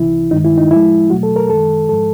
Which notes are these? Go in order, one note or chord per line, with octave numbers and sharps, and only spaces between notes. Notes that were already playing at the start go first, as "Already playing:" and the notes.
Already playing: C2 C3 E3 E4
G2 D#3 G#3 D#4
E4
D#4
A2 F3 G#3 E4
E2 B2 F#3 A3 F#4
A4
A#4
F#2 D#3 G#3 A4
G#2 F3 G#3 A4